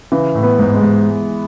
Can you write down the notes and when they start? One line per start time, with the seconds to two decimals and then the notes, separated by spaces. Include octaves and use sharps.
0.12 C#3 E3
0.35 A2
0.43 B3
0.59 G#2
0.74 G#3
0.81 G#2